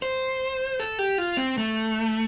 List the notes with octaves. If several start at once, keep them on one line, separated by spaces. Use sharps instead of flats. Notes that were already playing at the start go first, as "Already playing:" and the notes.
C5
A4
G4
F4
C4
A3